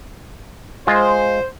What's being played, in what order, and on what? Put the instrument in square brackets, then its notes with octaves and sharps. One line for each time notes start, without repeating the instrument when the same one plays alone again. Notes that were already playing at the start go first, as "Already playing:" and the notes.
[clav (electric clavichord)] G#3 F4 [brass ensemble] C5